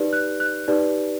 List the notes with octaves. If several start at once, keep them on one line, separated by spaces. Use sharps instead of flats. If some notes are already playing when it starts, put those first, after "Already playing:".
Already playing: D#4 G4 B4 D5
F#6
F#6
D#4 G4 B4 D5